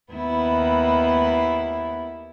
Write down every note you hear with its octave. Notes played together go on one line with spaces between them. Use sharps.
D#2 B3 E4